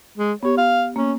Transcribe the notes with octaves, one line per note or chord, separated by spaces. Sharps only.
G#3
B3 G4 C#5
F5
A#3 C#4